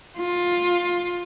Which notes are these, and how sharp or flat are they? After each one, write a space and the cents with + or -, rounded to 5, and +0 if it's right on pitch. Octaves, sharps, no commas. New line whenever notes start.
F4 +15